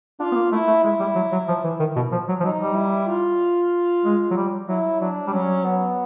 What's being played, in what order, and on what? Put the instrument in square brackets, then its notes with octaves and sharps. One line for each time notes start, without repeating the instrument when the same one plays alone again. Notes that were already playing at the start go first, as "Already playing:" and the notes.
[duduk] D4 [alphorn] F4
[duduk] B3
A#3
[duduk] A3 [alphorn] E4
[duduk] A3
[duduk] G#3 [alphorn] E4
[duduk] G3
F#3
F#3
F3
E3
D#3
B2
F3
F#3
F3
[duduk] F#3 [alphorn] D#4
[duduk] G3
[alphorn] E4
F4
[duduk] G#3
F#3
G3
[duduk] F#3 [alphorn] E4
[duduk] F#3 [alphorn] D4
[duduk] G3
[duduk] F#3 [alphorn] C#4
[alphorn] B3